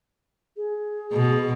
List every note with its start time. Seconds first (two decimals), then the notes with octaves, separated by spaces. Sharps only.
0.56 G#4
1.13 B2